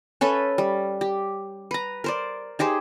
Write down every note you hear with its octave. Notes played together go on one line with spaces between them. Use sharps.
C#4 A4 B4 E5
G3
G4
B4 A#5
A#4 C5 D5
D#4 G4 G#4 C5